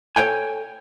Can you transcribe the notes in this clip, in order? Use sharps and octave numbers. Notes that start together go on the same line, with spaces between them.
A4 B4 C#5 G5 G#5